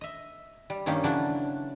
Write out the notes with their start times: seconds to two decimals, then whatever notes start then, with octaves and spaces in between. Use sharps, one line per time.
0.01 D#5 E5
0.70 G3
0.86 G2 D#3 A#3 C#4 D#4 G4
1.04 C#3 E3 F#3 D4